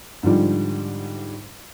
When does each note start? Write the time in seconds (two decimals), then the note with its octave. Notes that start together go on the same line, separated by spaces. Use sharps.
0.23 G#2 D3 F3 G3